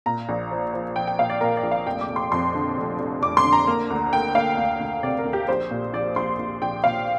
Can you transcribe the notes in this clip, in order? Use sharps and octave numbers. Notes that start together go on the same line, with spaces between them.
A#2 A#5
A#1
F3
F3
F3 G5
G5
A#2 F5
D5
A#2 A#4
D5
A#1
F5
F1 G5
D6
F1
C6
F2 C6
D3
F1
F1
F1 D6
C6
D3
A#5
A#3
D2
A#3 G5
A#3 F5
D2
D2
C3 D5
A#4
D2
G4
A#1 C5
A#2
A#1 D5
A#1 C6
A#1
A#1 G5
A#2 F5